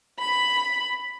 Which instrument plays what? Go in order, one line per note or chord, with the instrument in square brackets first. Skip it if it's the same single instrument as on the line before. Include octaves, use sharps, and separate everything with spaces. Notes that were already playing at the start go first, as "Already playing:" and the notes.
[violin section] B5